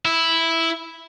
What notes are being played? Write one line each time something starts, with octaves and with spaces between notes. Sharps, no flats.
E4